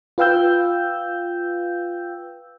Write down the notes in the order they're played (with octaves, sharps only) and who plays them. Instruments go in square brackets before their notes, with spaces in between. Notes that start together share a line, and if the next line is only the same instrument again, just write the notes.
[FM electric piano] F4 B4 F5 G5 E6 G6